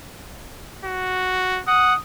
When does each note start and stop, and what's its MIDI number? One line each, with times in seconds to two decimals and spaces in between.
0.84 1.61 66
1.68 1.94 78
1.68 1.96 87